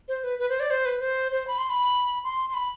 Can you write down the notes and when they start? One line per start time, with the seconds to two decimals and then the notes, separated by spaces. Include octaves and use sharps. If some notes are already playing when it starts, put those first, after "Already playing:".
0.08 C5
0.24 B4
0.39 B4
0.49 C5
0.60 D5
0.70 C5
0.86 B4
1.00 C5
1.32 C5
1.47 B5
1.58 C6
1.70 B5
2.24 C6
2.50 C6
2.54 B5